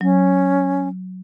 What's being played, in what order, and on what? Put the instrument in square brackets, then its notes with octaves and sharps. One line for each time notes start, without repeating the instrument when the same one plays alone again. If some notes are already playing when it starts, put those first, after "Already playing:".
[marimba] F#3 [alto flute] C#4